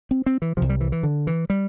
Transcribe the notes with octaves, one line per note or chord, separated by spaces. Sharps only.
C4
C4
E3
C2 C3 F3
G3
E3
E3
D3
E3
G3